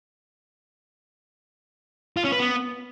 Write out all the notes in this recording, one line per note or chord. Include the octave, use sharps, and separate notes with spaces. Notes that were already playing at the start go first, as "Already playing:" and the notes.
F4
C#4
B4
B3